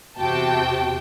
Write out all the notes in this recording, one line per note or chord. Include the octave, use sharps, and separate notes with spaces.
E2 C3 F#4 G4 G5 A5